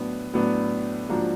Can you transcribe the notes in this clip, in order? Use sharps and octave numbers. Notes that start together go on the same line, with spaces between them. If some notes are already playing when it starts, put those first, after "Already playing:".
Already playing: A2 F#3 B3 D4
A2 F#3 B3 D4
G#2 F3 A#3 D4 F#4